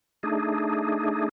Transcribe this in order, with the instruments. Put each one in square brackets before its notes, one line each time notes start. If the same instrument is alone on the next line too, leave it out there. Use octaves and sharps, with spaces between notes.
[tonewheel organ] A3 D4 D#4 G#4